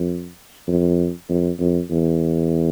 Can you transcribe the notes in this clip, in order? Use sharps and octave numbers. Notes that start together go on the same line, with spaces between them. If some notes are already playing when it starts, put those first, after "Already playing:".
Already playing: F2
F2
F2
F2
E2